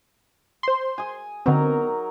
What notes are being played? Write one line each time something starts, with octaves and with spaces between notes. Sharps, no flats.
C5 C6
G#4 G#5
D3 F#3 B3 C4 D#4 A#4